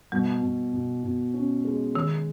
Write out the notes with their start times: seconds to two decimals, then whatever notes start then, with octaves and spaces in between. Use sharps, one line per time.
0.12 B2 G3
0.42 B2
0.73 B2
1.04 B2
1.34 C#4
1.65 G#3
1.95 D#3 G#3